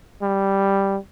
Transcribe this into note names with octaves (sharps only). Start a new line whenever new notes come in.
G3